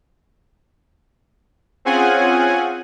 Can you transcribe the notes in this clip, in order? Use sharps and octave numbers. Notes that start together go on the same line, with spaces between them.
C4 C#4 F4 G#4 F#5 G#5